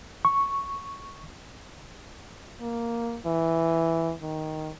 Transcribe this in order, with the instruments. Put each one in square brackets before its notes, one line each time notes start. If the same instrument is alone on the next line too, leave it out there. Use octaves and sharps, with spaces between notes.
[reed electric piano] C#6
[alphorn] A#3
E3
D#3